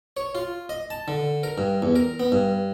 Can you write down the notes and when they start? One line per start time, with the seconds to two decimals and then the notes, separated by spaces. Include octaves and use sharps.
0.17 C#5
0.35 F4
0.69 D#5
0.90 A5
1.08 D3
1.43 A#4
1.58 G2
1.82 E2
1.96 A#4
2.20 B3
2.32 G2